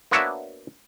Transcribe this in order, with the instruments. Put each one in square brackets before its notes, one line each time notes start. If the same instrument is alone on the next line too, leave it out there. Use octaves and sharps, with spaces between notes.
[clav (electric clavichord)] A#3 B3 D4 F#4 C#5 E5